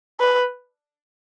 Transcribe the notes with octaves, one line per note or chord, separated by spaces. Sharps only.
B4